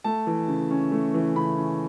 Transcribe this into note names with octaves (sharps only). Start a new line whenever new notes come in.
A3 A5
E3
C#3
C#4
A3
E3
C#3 B5
C#4